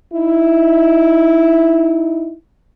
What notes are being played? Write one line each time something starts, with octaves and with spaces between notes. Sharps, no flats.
D#4 E4